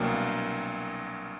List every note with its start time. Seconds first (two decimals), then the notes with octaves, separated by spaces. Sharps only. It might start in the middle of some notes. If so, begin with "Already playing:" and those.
Already playing: C2 B2 F#3 A#3 D4 G5